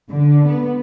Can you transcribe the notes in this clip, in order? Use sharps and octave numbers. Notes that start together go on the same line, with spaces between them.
D3
B3